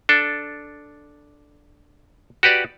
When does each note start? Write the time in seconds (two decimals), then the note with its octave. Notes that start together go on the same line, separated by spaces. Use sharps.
0.09 D4 A4
2.43 F#4 G4 B4 D5